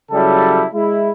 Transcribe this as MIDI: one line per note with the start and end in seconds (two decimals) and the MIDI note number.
0.12 0.64 49
0.12 0.64 54
0.12 0.64 55
0.12 0.64 64
0.12 0.64 69
0.74 1.11 56
0.74 1.11 64